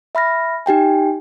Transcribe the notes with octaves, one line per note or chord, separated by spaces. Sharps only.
E5 B5 F6 A#6
D#4 G4 G5 G#5